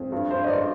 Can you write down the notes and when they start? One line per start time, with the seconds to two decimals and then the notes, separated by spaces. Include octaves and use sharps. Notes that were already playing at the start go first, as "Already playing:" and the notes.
Already playing: F2
0.12 G2
0.30 G2 C5
0.44 D#5
0.48 G2 D5